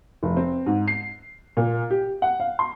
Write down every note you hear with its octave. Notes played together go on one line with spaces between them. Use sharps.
F1
C4
G#2
C7
A#2
G4
F#5
F5
C6